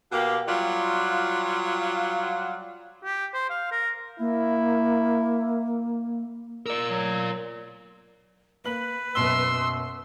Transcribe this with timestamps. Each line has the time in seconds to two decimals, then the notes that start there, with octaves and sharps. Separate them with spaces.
0.12 B2 A#3 G4
0.47 F#3 G3 F4
3.03 G4
3.34 C5
3.50 F5
3.72 A#4
4.19 A#3 E4
6.66 A#4 D5 A#5 D6 E6
6.89 F#3
8.64 A#3 B4 F#7
9.15 F#2 B2 C6 E6 G7